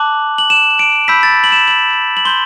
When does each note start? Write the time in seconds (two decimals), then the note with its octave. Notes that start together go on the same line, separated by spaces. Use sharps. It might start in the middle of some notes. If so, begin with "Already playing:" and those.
Already playing: A5 D6 F#6 F#7
0.38 F#7
0.50 E7
0.79 D7
1.08 B5 E6 G6 B6
1.23 A6
1.44 F#7
1.52 E7
1.68 F#7
2.17 F#7
2.25 C6 G6 G7